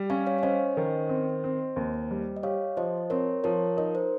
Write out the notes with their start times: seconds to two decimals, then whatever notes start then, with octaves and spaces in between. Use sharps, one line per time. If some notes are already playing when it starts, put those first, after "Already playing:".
Already playing: G3
0.10 C#4 F5 G#5
0.26 C#5 F5
0.38 C#5
0.43 C#4 C5 D#5
0.77 D#3
1.09 C4
1.44 C4
1.76 D#2
2.11 G3
2.36 D#5
2.43 G4 C#5 F5
2.77 F3 C5 D#5
3.10 C4 A#4 C#5
3.44 F3 A#4 C#5
3.77 D#4 A#4
3.95 C5